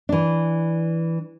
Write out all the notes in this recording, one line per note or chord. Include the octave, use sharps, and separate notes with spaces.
E3 D4